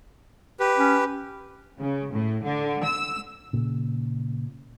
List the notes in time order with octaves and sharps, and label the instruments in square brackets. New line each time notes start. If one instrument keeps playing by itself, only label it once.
[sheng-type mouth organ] G4 B4
[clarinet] C#4
[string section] C#3
A2
D3
E6
[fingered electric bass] A#2 C#3